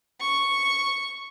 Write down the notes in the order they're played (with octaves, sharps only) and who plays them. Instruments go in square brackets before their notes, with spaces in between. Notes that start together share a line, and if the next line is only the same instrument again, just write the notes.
[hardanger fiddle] C#6